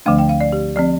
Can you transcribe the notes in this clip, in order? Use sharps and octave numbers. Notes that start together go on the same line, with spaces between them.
D2 D3 F3 A3 D4 F5
G5
F5
D5
G4
F3 C4 D5